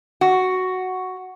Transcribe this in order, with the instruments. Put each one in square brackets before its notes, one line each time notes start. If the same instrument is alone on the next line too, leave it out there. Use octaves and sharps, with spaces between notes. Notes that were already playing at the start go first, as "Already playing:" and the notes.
[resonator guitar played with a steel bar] F#4